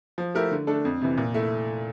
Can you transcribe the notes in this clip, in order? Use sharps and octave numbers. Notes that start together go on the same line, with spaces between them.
F3
A3 E4 G4 A#4
D3
A3 D4 A4
F2
C3 E3
A#2
A3 E4